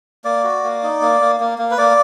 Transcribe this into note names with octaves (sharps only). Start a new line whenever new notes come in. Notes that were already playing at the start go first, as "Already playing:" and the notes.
A#3 D5
F#4
A#3
D#4
A#3
A#3
A#3
A#3
B4
A#3 D5